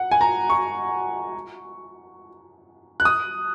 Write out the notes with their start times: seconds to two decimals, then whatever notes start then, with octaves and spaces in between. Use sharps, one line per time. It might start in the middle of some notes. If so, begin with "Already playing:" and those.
Already playing: F#5
0.11 G#5
0.21 A#5
0.50 C#6
3.00 F#6
3.05 D#6